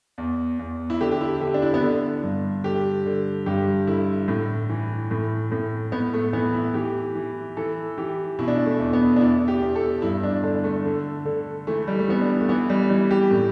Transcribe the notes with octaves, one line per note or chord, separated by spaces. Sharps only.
E2
E2
E4
D3 G4
G4
E4
D3 G4
D4
E4
B3
D3 D4
G2
D3 G4
D3
G2 G4
D3 E4
A2
E3
A2
A2
A2 B3
A3
E3 B3
E4
E3 G4
E3
E3 A4
E3 G4
B2 E4
D4
E4
A3
E2
B3
D4
E2 E4
G4
E2
A4
G2 E4
D4
D3 D4
A3
D3
D3
E3 A3
G3
A3
E3 B3
D4
A3
E3 B3
G3
E3 G3
G4
A2